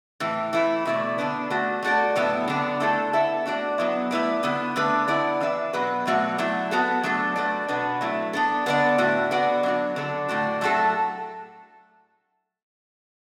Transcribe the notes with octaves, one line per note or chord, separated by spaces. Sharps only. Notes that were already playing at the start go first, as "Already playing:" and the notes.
A2 E3
E3 A3 E4
B2 A3 E4 D5
D3 B3 D4 B4
A3 D4 F#4
A3 F#4 A4 D5
A2 F#3 B3 E4
D3 B3 D4
D3 A3 E4 A4
B3 E4 A4 E5
A3 D4 F#4 D5
F#3 B3 E4
A3 E4 B4 D5
D3 B3 E4
D3 A3 D4 B4
B3 E4 D5
E3 D4 B4 E5
B2 F#3 B3 F#4 B4
B2 F#3 A3 F#4 D5
F#3 A3 E4
B3 F#4 A4
F#3 A3 D4 A4
A3 F#4 B4 D5
B2 B3 D4 B4
F#3 A3 E4
B3 D4 A4
D3 B3 D4 B4 D5
A2 A3 F#4
D3 B3 F#4 D5
F#3 D4 F#4
D3 F#3 D4 A4
A2 A3 D4 F#4
A2 F#3 A3 F#4 A4